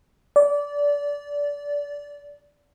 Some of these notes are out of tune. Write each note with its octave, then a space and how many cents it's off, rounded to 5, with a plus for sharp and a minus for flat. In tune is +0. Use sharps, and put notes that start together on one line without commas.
D5 -20